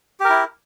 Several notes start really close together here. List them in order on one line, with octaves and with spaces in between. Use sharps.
G4 A#4 E4